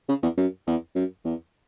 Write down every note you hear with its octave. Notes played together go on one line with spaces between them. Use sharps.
C#3
E2
F#2
E2
F#2
E2